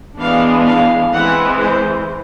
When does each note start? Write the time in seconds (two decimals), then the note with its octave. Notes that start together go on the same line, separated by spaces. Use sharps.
0.19 E3 G#3 B3 D4 F5
0.66 F5
1.12 E3 G#3 C4 F#5
1.60 C5